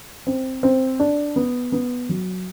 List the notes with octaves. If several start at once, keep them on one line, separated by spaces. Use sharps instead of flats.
C4
C4
D4
B3
B3
F#3